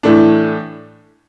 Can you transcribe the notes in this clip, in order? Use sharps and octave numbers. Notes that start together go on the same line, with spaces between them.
A2 E3 A3 D4